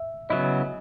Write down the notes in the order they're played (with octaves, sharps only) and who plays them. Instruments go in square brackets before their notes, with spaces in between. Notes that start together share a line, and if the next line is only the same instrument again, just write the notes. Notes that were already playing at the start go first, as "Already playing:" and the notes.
Already playing: [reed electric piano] E5
[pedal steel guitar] C#3 F#3 B3 E4 [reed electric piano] D#5